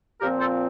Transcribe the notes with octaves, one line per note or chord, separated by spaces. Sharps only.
A#2 F3 C4 G4 A#4
A4 C5